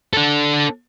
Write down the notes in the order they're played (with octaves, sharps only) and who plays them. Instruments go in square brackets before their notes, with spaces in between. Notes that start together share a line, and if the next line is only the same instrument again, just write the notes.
[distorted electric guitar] D4 A4